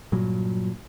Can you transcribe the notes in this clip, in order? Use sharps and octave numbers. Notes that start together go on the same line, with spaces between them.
G2 A#2 F#3